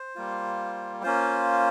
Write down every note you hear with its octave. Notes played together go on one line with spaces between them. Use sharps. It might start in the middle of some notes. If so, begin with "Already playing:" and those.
Already playing: C5
G3 A#3 F4
A#3 C#4 F4 C5